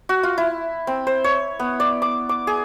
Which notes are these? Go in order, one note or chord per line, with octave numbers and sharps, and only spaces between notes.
F#4
F4
E4
C4
C5
C#5
B3
D5
D6
D6
G#4